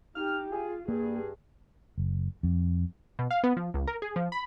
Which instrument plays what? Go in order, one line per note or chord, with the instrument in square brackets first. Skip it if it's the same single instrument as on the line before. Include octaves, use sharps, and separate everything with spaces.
[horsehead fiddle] D#4 G4 [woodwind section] F6
[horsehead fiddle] F4 [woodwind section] G#4
[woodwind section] G2 [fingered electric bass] A#3 [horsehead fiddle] G#4
[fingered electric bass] F#1
F2
[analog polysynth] B2
F5
B3
F3
C#2
A#4
G#4
F3
B5